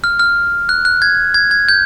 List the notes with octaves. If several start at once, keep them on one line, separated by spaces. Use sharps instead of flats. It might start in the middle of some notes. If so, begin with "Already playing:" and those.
F6
F6
F#6
F#6
G#6
G#6
G#6
G6